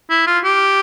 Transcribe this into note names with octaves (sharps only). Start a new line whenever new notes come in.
E4
F4
G4